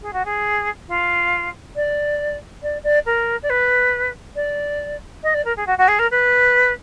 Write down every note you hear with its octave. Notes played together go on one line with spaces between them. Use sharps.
G#4
F#4
G#4
F4
D5
D5
D5
A#4
D5
B4
D5
D#5
D5
A#4
G#4
F#4
F#4
G#4
A#4
B4